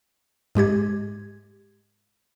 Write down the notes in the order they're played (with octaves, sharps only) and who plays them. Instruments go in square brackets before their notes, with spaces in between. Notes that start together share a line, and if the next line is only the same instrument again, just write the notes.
[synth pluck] G#2 G#3 G4 G#6